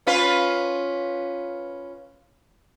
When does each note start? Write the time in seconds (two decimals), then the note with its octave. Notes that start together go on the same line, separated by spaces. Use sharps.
0.07 C#4 F4 B4